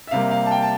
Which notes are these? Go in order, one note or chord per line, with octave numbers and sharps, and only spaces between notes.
E5
C3 G3 A#3 F5
F5
A5
G5
A5